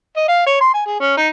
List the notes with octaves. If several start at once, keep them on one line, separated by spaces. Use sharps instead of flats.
D#5
F5
C#5
C6
G#5
G#4
C#4
D#4